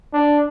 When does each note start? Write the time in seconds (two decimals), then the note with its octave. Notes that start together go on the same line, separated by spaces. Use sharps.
0.13 D4